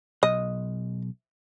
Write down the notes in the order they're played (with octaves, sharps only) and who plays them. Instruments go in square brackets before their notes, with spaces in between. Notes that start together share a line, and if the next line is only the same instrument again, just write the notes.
[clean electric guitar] B1 [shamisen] D#5